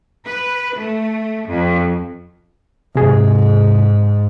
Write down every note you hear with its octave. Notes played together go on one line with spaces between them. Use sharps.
B4
A3
F2
G#2 C3 G#4